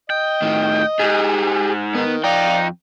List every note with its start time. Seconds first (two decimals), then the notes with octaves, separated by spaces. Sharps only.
0.10 D#5 G5
0.42 A2 D#3
0.99 G#2 G4 G#4
1.95 D#3 B3
2.24 F2 D#4 D5 F5 G5